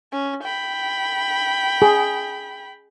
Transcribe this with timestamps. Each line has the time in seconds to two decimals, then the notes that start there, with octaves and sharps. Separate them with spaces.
0.12 C#4
0.44 G5 B5
1.82 G#4